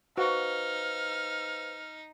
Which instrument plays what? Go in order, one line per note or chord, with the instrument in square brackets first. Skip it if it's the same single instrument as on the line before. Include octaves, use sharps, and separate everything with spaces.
[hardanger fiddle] D#4 [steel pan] F#4 [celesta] B4 C5 F5 [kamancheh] F6